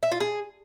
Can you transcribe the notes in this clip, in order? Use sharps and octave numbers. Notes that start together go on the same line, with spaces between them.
E5
F4
G#4